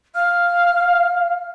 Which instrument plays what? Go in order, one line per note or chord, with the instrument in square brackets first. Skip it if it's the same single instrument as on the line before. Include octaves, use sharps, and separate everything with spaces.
[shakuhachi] F5 [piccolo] F6